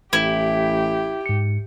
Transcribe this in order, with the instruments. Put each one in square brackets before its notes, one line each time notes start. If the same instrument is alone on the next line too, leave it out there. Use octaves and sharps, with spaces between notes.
[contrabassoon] A1 [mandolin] E4 [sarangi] G4
[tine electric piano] G#2 C#7